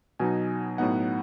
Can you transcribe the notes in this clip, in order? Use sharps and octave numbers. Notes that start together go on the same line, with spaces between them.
B2 F#3 B3 D#4 G#5
A2 F#3 B3 D#4 F#5